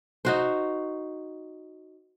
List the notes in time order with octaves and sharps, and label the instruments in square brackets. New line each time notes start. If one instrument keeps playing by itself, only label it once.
[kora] D#4 F#4 C5